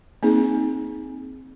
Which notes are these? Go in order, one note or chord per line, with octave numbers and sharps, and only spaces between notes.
A#3 C4 D#4 G#4